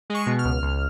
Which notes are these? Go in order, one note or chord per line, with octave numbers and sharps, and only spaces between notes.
G#3 C#6
B2
F6
C#2
C#2